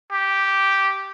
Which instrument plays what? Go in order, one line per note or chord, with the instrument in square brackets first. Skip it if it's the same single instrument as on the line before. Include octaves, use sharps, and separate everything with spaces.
[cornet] G4